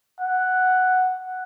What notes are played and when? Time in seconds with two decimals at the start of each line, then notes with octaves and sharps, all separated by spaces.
0.20 F#5